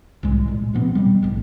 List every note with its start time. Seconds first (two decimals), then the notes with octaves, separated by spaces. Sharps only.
0.23 C2 A2 G#3
0.48 A#2 G#3
0.73 B2 F3 B3 C4
0.95 B2 G3
1.22 A#1 A2